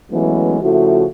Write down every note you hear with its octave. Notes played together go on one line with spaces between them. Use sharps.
E3 F#3 G#3 A3 B3 C#4
C#3 F3 A3 E4 F#4